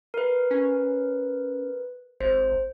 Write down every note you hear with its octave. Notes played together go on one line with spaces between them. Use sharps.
A#4 B4
C#4
G#1 C5